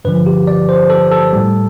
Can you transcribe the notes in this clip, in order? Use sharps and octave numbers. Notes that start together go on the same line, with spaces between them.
G2 D3 F3 B4
G4
D5
C5
A4
A4
A2 G3